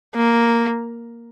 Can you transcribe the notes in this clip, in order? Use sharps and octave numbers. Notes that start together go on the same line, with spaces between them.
A#3